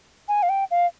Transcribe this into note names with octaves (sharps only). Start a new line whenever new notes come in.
G#5
F5
G5
F5